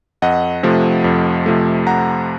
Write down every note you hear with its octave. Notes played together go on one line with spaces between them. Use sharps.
F2 D#5 F#5
C3 F3 A3
F2
C3 F3 A3
F#5 A#5